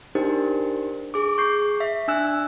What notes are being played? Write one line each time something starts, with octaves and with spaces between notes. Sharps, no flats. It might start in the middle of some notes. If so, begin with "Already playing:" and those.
D4 D#4 G4 A#4 C5
G#4 D6
C#6 G6 C7
E5 B6
D4 G#5 E6 F#6